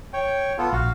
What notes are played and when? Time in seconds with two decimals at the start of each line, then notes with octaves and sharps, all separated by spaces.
0.13 C#5 G5
0.58 B3 F4 A4
0.73 A#1 F#4 F5